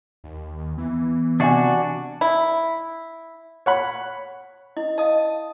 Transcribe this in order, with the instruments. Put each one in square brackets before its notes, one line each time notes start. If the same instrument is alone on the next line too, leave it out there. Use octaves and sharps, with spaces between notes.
[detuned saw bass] D#2
[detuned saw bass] E3 [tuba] B3
[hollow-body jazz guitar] C3 D#5 G#5 [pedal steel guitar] D4 F#4
[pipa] E4
[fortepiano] C#5 F#5 B5
[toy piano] E4 [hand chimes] D#5
[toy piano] D#5 F5 [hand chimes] A5 D#6